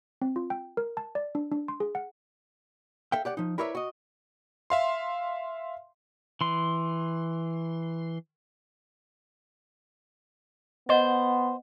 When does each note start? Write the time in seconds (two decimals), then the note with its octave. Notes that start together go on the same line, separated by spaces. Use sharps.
0.22 C4
0.36 F4
0.50 G5
0.77 A#4
0.97 A5
1.15 D5
1.35 D4
1.52 D4
1.68 C6
1.80 G#4
1.95 F#5
3.12 A4 E5 F5 G5
3.25 G4 D5 F#5
3.37 F3 D#4
3.58 E4 A#4 B4 C#5 D5 E5
3.75 F#4 D#5
4.70 E5 F5 C6
6.41 E3 C6
10.89 B3 C5 D#5 F#5